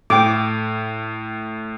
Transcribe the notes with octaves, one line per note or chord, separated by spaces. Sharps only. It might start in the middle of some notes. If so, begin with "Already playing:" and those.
A2 G5 D6